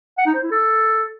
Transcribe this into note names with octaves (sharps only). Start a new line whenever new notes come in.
F#5
D#4
C5
E4
A4